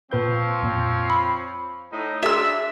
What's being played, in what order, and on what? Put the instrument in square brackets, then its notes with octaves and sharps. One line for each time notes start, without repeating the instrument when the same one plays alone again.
[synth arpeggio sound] A#2 B4 G6 [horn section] F3 C4 C#5
[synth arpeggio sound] F2 A#2
[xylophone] B5
[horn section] A2 D#4
[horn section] D4 [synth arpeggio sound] F#4 G#4 C6 [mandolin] E5 E6